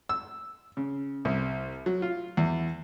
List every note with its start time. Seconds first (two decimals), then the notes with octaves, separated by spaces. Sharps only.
0.09 E6
0.77 C#3
1.25 C2
1.86 F#3
2.02 F4
2.37 E2